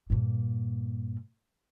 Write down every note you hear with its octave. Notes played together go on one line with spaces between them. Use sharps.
G2 A#2